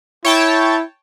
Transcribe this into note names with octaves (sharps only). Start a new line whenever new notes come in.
E4 C#5 G5 A5